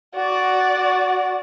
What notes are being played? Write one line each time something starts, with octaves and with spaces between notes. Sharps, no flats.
F#4 D5